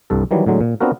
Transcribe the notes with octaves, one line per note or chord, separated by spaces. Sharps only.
C2 G2 A4
D#3 E3 F#3 G3
A2 D3 F#3 G#3
A#2
B3 C4 D4 F4 F#4 A#4